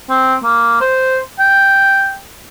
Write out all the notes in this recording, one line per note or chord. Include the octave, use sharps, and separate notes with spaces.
C4
A#3
C5
G5